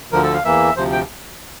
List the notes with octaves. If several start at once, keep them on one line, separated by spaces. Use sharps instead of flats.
D2 D3 F3 A#4
A4
F5
E2 E3 A#3 E5
D2 C3 F3 C5
G5